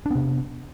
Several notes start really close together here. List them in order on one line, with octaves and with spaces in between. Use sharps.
D4 B3 C3